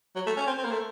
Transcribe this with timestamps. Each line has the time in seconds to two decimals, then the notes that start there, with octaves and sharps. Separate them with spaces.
0.16 F#3
0.27 A3
0.37 C#4
0.47 C4
0.58 C4
0.64 A#3
0.71 A3